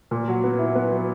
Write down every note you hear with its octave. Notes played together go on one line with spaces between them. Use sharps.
A#2
F#3
B3
E4
B3
F#3